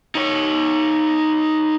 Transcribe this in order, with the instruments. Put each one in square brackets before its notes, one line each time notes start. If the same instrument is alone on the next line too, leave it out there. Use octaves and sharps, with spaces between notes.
[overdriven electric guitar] D#4 C#5